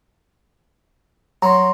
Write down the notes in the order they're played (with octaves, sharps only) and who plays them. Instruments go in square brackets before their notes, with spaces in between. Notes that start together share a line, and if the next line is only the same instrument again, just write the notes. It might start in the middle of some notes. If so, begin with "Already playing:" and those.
[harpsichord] F#3 [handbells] A#5 C6